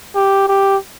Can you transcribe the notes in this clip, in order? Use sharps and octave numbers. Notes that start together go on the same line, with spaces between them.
G4
G4